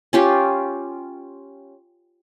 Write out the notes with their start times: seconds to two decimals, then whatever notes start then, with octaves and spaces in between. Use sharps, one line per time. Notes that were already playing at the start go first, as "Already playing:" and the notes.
0.13 C#4 F4 G4